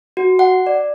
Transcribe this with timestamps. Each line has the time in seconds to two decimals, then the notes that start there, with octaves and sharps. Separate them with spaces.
0.17 F#4
0.39 F#5
0.67 D5